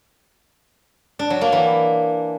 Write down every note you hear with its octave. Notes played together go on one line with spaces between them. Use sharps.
D4
F#3
A#3
E3